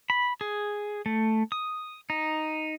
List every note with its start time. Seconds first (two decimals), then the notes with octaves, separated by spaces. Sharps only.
0.10 B5
0.41 G#4
1.06 A3
1.52 D#6
2.10 D#4